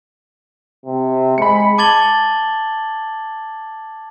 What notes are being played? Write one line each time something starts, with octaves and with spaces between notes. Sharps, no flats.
C3
G#3 B5 C#7
A5 D6 G#6 A6 F#7 G7